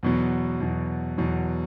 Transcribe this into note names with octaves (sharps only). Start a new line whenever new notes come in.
E2 B2 F#3
E2 B2 F#3
E2 B2 F#3